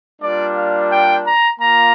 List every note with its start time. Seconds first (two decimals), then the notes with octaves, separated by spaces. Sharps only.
0.21 G3 A#3 D4 F4 D5
0.56 F5
0.91 G5
1.25 A#5
1.60 A#3 F4 A#5